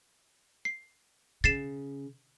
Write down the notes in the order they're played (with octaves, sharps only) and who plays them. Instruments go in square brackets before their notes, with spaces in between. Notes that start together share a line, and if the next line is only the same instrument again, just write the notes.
[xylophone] C7
[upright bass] C#3 [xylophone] A6 C7 E7